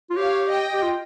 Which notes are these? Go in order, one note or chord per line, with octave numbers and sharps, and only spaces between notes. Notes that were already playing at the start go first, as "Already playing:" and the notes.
F4
G4 C#5 F5
D#5 G5
G4
F4